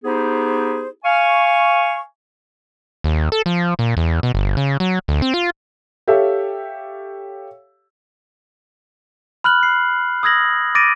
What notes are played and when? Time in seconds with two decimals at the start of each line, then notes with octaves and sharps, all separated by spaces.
0.05 B3 D#4 E4 G4 G#4 C5
1.05 F5 G#5 C#6
3.04 D#2
3.32 A4
3.46 F3
3.79 A#2
3.97 E2
4.23 B2
4.34 G1
4.57 C#3
4.80 F#3
5.08 D2
5.22 C4
5.34 F4
6.08 G4 A4 C#5 E5 F5
9.44 B5 F6 F#6 F#7
9.63 C7
10.23 D#6 E6 G#6 A#6 F#7
10.75 D6 A6 A#6 D7 D#7